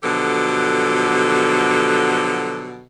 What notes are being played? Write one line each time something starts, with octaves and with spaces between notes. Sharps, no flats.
B2 D3 F3 F#3 G4 A4